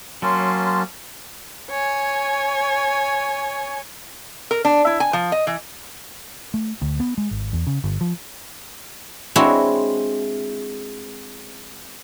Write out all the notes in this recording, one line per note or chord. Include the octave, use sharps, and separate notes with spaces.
F#3 A#3 C#4 A5 C6
C#5 G#5
A#4
D4
E4
G#5
F3
D#5
E3
A3
D2
B3
G#3
G#1
E2
C#3
G1
F3
G#3 C4 D4 E4 F#4 C#5